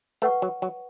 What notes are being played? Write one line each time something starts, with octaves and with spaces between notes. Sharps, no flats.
A3 B4 F#5 C#6
F#3
F#3